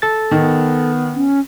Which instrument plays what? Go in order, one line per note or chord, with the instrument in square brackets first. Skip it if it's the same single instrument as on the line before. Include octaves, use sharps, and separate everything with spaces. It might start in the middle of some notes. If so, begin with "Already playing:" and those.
[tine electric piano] A4 A6
[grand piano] D#3 [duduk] B3
[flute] C#4